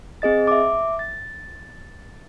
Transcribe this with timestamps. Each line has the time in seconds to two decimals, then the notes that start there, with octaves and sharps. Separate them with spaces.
0.22 C4 G#4 D#5 A6
0.47 E5 D6
0.99 A6